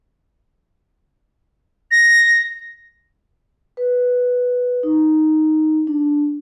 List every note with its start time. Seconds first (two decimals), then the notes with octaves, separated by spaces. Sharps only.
1.91 A#6
3.77 B4
4.83 D#4
5.87 D4